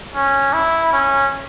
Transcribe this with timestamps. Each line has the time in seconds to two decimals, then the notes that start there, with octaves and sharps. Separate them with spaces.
0.15 C#4
0.53 E4
0.93 C#4